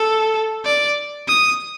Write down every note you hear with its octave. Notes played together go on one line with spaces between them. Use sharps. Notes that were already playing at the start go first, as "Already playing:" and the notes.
Already playing: A4
D5
D#6